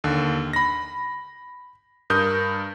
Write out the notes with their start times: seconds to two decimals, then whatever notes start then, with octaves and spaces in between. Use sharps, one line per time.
0.04 D#2 D3
0.53 B5 A#6
2.10 G2 A#4 D#6 G6